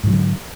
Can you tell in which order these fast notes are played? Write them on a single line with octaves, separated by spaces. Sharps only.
G#2 D#3 F#3 D3